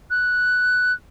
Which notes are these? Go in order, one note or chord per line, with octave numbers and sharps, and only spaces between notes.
F#6